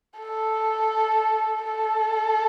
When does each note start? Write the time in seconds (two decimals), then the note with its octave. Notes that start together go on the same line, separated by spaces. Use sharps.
0.18 A4
1.64 A4